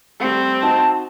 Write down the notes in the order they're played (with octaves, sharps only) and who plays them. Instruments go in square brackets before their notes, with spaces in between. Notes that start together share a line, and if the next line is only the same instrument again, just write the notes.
[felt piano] G3 A3 [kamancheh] C4
[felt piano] D#4 F#4 [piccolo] A5